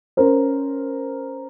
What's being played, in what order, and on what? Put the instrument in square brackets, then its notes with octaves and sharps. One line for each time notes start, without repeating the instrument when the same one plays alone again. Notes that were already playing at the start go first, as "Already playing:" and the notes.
[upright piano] C#4 A#4 C5